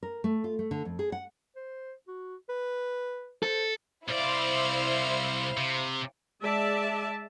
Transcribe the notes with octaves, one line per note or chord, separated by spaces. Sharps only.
A#4
A3
F4
A3
D3
F2
G#4
F#5
C5
F#4
B4
A4 C5
C2 E4 C5 D5 F5
C3
G#3 D5 E5 A5